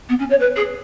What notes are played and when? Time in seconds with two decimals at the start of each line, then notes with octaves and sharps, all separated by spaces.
0.09 B3
0.19 C#4
0.30 C#5
0.40 B4
0.56 G#4